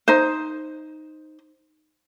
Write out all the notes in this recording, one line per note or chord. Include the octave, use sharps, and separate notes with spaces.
D#4 C5